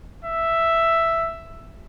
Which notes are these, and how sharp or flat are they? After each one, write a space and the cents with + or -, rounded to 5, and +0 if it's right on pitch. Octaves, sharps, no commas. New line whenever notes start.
E5 +5